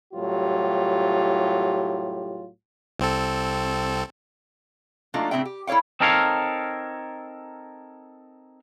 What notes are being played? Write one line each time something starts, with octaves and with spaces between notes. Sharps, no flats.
C2 A2 F#3 F4 G4
C2 C4 A4
F#3 A3 A#3 D4 D#4 F4
A2 C#3 C4 G#4 E5 G5
G4
E4 A4 C#5 F5 G5
C4 D#4 A4 A#4 C#5 F5